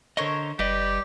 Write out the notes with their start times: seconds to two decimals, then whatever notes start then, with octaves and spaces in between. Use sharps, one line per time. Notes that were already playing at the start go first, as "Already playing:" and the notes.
0.17 D3 A4 A#4 C5 C#5 D#5
0.59 F#1 G3 G4 B4 D5 D#5